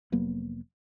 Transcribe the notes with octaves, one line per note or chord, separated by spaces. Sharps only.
F1 F#3 A#3 B3